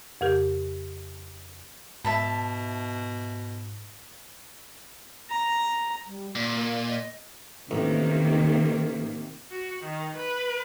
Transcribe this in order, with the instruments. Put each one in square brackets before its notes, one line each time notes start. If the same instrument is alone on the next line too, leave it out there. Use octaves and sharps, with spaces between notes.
[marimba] F2 C#3 G4 A#4 G6
[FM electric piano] G#2 [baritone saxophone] B2 [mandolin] E5 A5 B5
[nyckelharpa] A#5
[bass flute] G3
[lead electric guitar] A#2 [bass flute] D5
[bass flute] A#3
D#5
[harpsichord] A1 [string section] C3 D#3 A#3
[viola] F#4
D#3
B4